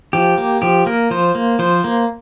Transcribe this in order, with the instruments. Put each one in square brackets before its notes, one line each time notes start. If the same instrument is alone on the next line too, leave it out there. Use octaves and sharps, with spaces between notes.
[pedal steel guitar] F3 G4
A#3
F3 G4
A#3 A#4
F3 C5
A#3
F3 C5
A#3